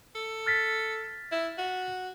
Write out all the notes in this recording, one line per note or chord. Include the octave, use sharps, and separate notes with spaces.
A4
F6 A6 B6
E4
F#4